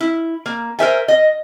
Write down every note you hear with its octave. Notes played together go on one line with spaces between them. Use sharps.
E4
A#3
A#4 C5 E5 G#5
D#5